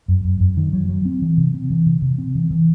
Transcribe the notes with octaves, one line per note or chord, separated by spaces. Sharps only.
F#2
F#2
F#2
D#3
F#3
F#3
C4
E3
C3
C4
E3
C3
C3
C4
E3
E3